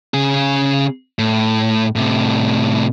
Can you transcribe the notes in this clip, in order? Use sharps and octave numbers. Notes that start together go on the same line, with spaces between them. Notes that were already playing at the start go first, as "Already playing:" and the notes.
C#3 G#4
A2
A2 C3